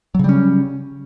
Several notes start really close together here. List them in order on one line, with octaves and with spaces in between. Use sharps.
F#3 C#3 G3 C#4